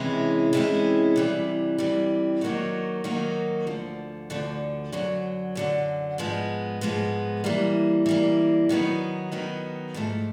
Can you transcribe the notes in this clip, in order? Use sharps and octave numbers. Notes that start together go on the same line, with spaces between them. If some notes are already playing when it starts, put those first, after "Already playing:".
Already playing: C3 E3 G#3 C#4 E4
C3 E3 G#3 C#4 E4
C3 E3 G3
C3 E3 G3
D#3 F#3 A#3 D#4 F#4
D#3 F#3 A#3 D#4 F#4
D2 D3 F3
D2 D3 F3
F#2 D3 F#3
F#2 D3 F#3
G#2 F3 G#3 B3
G#2 F3 G#3 B3
E3 G3 A#3
E3 G3 A#3
D#3 F#3 B3 D#4
D#3 F#3 B3 D#4
G#2 F3 A3